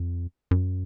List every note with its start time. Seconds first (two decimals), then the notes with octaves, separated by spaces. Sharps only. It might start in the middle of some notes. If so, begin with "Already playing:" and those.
Already playing: F2
0.51 F#2